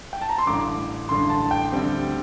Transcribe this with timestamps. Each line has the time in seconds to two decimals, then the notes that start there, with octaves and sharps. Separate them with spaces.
0.13 G5
0.22 A5
0.29 A#5
0.38 C6
0.46 A1 G2 D3 D6
1.09 A1 G2 D3 C6
1.30 A5
1.51 G5
1.72 D2 D3 G3 C4